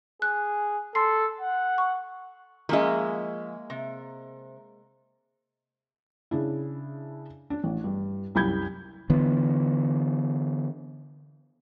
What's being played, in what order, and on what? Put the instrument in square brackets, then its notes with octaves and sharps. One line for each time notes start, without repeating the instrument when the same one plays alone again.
[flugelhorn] G#4 [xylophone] F#6
[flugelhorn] A4 [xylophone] C6 C7
[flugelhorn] F#5
[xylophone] C#6
[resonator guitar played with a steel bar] F3 C#4 E5 [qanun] G#3 A#3
[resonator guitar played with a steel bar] C3
[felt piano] C#3 D4 E4
D4
A1
G2
C2 F#2 B5 G6 G#6
[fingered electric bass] D3 E3 B3